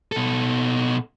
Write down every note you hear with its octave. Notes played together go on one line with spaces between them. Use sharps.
B2 A4